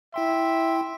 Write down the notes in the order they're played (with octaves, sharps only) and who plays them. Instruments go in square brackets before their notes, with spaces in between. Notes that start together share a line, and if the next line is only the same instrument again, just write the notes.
[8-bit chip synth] E4 G5 C6 [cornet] E5